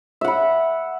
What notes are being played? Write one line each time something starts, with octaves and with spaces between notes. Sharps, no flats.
E5 F#5 B5